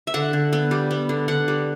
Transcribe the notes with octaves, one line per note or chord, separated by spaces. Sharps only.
E5
D3 F#5
D3
B3
G3
B3
D3
D3 F#5
G3